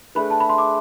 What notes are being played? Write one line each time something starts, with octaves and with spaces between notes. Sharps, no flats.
A3 D4 G#4 B4 B5
A5
B5
C6
D6